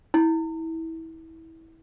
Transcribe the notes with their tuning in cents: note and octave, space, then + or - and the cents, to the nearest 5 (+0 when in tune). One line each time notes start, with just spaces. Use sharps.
E4 -25